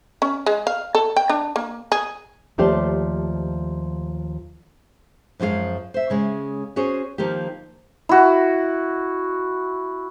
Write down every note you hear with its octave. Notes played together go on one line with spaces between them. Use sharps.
C#4
G#3
F5
A4
G5
D4
A#3
G#4
D#2 F3 A3 G4 C5 D5
F#2 F3 G#3 F#4 F5
C5 E5
C#3 G#3 C#4
C#4 F#4 G#4 C5 C#5
D#3 F3 A#3 D#4 G4
E4 F#4